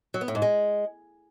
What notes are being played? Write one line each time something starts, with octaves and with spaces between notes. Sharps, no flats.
F#3
B3
A2
G#2
G#3